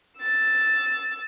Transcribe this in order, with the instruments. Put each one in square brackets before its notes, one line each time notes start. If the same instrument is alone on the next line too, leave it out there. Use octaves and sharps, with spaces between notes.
[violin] E6 A6